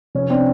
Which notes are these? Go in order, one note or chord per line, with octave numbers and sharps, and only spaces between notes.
F1 C#4
C4 D4